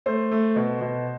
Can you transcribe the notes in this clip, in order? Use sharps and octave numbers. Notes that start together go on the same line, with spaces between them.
A3 C5
A3
B2
B2